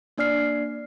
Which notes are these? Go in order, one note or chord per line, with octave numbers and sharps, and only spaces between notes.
A#3 D4 D5 F6 C7